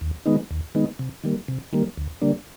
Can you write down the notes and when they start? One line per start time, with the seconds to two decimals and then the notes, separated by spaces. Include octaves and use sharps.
0.01 D#2
0.26 D#3 G#3 B3 D#4
0.51 D#2
0.75 D#3 G#3 B3 D#4
0.99 C3
1.24 D#3 G3 A#3
1.48 C3
1.73 D#3 G3 A#3
1.97 D2
2.21 D3 G3 A#3 D4